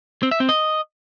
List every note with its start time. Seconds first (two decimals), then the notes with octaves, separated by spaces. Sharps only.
0.23 C4
0.31 E5
0.40 C4
0.49 D#5